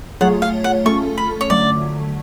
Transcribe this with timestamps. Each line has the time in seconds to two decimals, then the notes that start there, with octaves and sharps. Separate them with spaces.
0.21 F#3 A3 F4 G#4 C#5 F#5
0.42 F5
0.64 F#5
0.85 A3 C#4 F4 A4 C#6
1.18 B5
1.41 C#5
1.50 D3 F#3 A3 D5